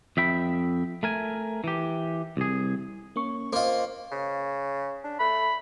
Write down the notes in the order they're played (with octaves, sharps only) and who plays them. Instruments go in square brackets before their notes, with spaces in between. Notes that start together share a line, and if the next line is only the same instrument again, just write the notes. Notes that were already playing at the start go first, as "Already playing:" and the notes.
[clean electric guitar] F2 E5 G5 B5
A3 A#4 G#5
E3 G4
C2 G#4
[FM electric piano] A#3 C#4 C#6
[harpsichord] A#3 F4 [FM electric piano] C5 D#5
[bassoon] C#3
D4
[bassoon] A3 [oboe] B5